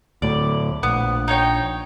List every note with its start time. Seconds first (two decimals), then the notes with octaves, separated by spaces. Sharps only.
0.22 D2 A2 D5
0.83 A#1 B3
1.28 D#4 C#5 G5